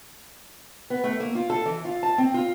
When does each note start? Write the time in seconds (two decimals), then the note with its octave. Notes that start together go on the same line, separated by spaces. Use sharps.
0.90 B3
1.04 A3
1.20 A#3
1.35 F4
1.50 A4
1.65 E3
1.85 F4
2.03 A5
2.18 C4
2.34 F4